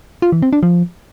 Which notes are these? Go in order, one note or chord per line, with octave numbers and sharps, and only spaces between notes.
F4
E3
C4
D4
F3